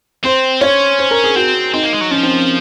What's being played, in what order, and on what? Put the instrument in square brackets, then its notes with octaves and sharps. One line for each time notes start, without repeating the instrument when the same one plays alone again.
[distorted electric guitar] C4 [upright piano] C5
[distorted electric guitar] C#4 [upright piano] C#5
[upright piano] C5
A#4
G#4
[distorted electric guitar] C4 [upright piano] F#4
[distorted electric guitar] C4 [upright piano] D#4
[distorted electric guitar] A#3
G#3
F#3
[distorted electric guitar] F3 [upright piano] C#4
[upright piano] C4